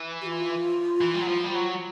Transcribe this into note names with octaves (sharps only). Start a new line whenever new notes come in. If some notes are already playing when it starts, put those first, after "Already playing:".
Already playing: E3
G4
F4
E3
G3
F#3
F3
G3
F#3